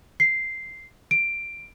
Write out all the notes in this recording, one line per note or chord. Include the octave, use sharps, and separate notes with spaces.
C7
D7